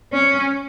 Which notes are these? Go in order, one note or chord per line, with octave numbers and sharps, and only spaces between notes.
C#4